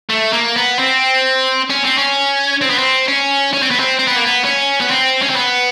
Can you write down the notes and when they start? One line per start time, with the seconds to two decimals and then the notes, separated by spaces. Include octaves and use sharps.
0.10 A3
0.33 A#3
0.56 B3
0.79 C4
1.70 C#4
1.84 C4
1.98 C#4
2.62 C4
2.70 B3
2.78 C4
3.08 C#4
3.53 C#4
3.63 C4
3.71 B3
3.80 C4
3.99 C4
4.08 B3
4.16 A#3
4.25 B3
4.45 C#4
4.81 B3
4.91 C4
5.22 C#4
5.29 C4
5.36 B3